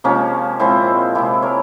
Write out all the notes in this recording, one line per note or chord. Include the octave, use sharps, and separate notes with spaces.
C3 F3 G#3 A#3 C#4
A#2 F3 G#3 C4 E4
C3 F3 G#3 E4 G4
A#4 C#5